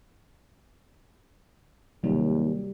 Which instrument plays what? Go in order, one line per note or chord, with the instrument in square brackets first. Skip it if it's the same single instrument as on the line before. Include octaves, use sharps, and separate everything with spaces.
[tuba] D#2 [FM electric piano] C3 F#3 [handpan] G3